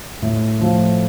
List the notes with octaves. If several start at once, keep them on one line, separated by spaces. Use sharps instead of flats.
A2
F3 A3